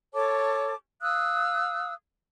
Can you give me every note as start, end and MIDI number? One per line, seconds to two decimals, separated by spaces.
0.15 0.74 69
0.15 0.74 73
0.15 0.74 81
0.15 0.74 86
1.01 1.94 77
1.01 1.94 87
1.01 1.94 88
1.01 1.94 90